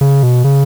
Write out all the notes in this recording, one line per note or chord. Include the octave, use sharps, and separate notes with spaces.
C#3
B2
C#3